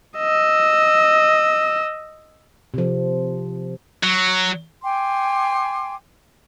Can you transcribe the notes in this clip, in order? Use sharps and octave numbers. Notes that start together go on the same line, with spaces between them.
D#5 E6
C3 F3
F#3
G5 G#5 C6 D6